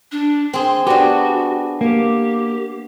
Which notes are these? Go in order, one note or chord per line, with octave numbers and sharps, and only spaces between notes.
D4
C4 G#4 C6
B3 D4 F#4 G4
A#3 G4